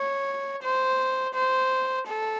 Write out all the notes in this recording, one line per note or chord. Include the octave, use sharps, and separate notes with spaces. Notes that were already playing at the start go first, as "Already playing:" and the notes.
Already playing: C#5
C5
C5
A4